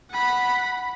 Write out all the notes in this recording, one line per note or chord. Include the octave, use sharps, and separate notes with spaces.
F#5 B5